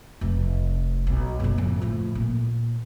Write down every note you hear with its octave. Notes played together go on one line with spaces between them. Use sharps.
F1 A3
B1
F#1 B1
A1 F2
A2 F3
A#2